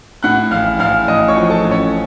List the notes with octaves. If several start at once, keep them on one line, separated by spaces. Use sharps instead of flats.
A2 F#5 F#6
A1 F5 F6
A1 F5 F6
A1 D#5 D#6
C#5 C#6
F3
A4 A5
A1
C#4 C#5